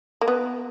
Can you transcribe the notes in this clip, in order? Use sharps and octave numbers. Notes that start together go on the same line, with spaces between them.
A#3
B3